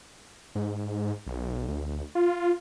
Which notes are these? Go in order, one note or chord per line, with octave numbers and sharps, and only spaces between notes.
G#2
B1
D2
F4